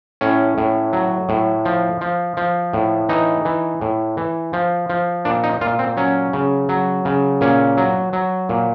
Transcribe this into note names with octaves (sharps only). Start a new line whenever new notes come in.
A2 C#4
A2
F#3
A2
F3
F3
F3
A2
E3 D#4
E3
A2
E3
F3
F3
A#2 D4
D#4
A#2 F4
C4
F#3 C#4
C#3
F#3
C#3
A#2 C#4
F#3
F#3
A#2